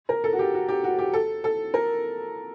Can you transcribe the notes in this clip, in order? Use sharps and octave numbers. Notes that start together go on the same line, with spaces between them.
A#4
A4
F#4
G4
F#4
G4
F#4
G4
A4
A4
A#4